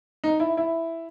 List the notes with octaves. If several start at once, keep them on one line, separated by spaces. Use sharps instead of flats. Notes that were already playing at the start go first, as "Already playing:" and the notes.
D#4
E4
E4